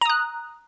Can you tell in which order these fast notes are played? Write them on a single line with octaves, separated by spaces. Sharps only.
A#5 D#6 F#6